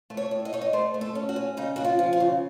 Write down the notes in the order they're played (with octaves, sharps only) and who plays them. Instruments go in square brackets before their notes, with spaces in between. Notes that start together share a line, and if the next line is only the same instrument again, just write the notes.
[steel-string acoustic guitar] A3
C#5
A2
D#5
D#4 C#5
D#5
A3 C5
A3
A4
C#4
F#4
C#4
C#3 D#4
C#3 F#4
F4
F3
F4
C#3